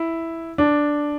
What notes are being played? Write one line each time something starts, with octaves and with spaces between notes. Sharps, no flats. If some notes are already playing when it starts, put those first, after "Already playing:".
Already playing: E4
D4